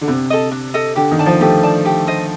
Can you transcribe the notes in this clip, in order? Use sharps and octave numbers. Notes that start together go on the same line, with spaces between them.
D3
C3 D4
A4 D#5
D4
A4 D#5
D3 G4
D#3
D5 A5
F3
A3 G4
D5 A5
G4
C5 D#5